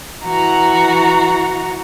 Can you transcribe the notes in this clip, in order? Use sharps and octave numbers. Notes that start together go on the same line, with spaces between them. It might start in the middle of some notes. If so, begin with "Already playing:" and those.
E3 F#4 A#5